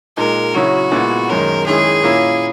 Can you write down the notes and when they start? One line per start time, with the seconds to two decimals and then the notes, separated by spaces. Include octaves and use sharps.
0.17 A#2 G#3 D#4 A#4
0.54 C#3 F#3 C#4 E4 F#4
0.91 A#2 G#3 B3 E4
1.29 F#2 D#3 G#3 C#4 A#4
1.66 D#3 G#3 C#4 E4 G#4
2.03 A#2 A#3 C#4 E4